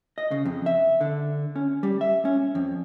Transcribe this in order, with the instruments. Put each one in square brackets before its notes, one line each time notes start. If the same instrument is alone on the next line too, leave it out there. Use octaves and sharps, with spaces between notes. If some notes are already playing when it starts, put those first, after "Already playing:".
[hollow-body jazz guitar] D#5
C#3
F2
E5
D3
C#4
G3
E5
C#4
F2